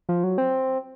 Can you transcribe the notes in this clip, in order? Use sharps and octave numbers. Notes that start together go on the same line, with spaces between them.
F3
F#3
C4